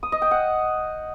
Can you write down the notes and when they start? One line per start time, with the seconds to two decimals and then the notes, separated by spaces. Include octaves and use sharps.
0.03 D#6
0.12 D#5
0.22 G5
0.31 F#5